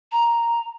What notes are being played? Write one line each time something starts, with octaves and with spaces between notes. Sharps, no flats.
A#5